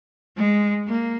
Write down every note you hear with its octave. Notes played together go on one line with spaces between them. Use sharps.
G#3
A#3